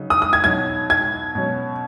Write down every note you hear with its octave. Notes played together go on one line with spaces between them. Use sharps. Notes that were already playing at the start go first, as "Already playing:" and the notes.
Already playing: C#3 F#3 D#4
D#6
D#6
G#6
B2 F#3 D#4 G#6
G#6
B2 F#3 C#4